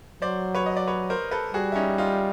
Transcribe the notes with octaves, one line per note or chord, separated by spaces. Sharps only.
F#3 C5 D5
B4 C#5
D#5
D5
B4 C#5
A#4 C5
A4 B4
G3 F#4 G#4
E4
C#4 D#4
D#4 F4